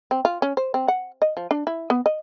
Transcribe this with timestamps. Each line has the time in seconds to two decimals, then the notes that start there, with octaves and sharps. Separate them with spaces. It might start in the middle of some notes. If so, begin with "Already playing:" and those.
0.11 C4
0.25 F4
0.42 C#4
0.57 C5
0.74 C4
0.88 F#5
1.22 D#5
1.37 F3
1.51 D4
1.67 E4
1.90 B3
2.06 D#5